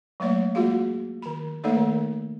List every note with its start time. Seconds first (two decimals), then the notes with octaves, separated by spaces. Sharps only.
0.20 F#3 A3 A#3 C#5 D5
0.55 G#3 A#3 F4 F#4 G#4 F5
1.22 D#3 B5
1.64 A3 A#3 D#4 A4 C#5 D5
1.76 D#3